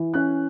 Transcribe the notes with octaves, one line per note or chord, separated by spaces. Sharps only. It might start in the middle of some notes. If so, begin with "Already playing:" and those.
Already playing: E3
C#4 F#6